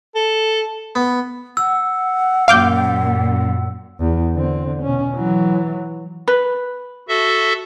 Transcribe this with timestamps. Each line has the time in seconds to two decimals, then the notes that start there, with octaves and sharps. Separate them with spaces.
0.15 A4
0.95 B3
1.57 F#5 E6
2.48 F#2 A#2 F5 D6 G6
4.00 E2
4.34 D3 C4
4.82 B2 C#4
5.15 E3 F#3
6.28 B4
7.08 F#4 A4 E5